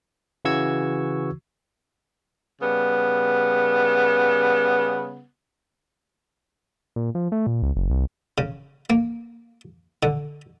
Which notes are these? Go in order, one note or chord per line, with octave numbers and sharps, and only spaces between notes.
C#3 E3 F#4 C#6 E6 G#6
C#3 G3 B3
A#2
F3
A3
A#2
C#2
F#1
C2
C#3
A#3
D3